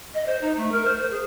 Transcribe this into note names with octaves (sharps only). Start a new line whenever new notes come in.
D#5
C5
D#4
A3
A#4
C5
C5
G#4